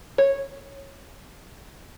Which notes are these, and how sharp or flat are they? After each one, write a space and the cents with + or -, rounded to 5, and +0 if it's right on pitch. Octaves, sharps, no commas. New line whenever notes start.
C#5 -10